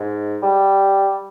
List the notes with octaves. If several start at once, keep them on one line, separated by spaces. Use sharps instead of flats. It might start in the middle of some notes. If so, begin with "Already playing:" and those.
Already playing: G#2
G3